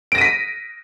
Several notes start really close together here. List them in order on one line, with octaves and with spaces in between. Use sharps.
D7 A#6 D#7 B6